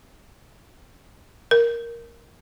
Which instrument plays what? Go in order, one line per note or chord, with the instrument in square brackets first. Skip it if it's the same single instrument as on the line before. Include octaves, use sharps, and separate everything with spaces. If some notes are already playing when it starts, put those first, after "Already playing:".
[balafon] A#4